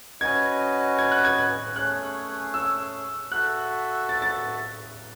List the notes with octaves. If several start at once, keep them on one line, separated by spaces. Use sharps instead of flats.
C#4 F#4 B4 D#5 G#6
G#6
F#6
G#6
A3 C#4 G#4 C#5 F#6
E6
F#4 A4 E5 F#6
A6
A6